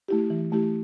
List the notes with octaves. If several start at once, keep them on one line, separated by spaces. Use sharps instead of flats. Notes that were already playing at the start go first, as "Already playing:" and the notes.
A3 E4 G4
E3
A3 E4 G4